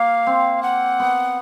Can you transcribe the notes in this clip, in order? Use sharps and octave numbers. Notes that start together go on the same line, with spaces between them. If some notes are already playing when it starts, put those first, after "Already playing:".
Already playing: A#3 F5
C4
F#5
B3